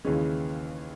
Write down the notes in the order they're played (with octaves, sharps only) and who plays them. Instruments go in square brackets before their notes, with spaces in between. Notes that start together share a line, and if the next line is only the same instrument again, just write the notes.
[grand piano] D#2 C#3 E3 G#3 C#4